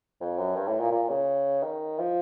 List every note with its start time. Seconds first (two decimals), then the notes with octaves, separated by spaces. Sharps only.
0.20 F2
0.38 F#2
0.56 G2
0.68 A2
0.80 A#2
0.91 A#2
1.09 C#3
1.63 D#3
1.99 F3